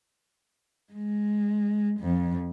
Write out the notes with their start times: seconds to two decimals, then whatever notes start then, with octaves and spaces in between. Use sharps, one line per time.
0.93 G#3
2.00 F2